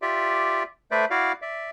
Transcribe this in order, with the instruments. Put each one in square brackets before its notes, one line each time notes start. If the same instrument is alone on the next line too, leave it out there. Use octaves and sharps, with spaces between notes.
[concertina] F4 G4 D5 E5
A3 B4 C5 D5 E5
E4 F#4 D5 F5
D5 E5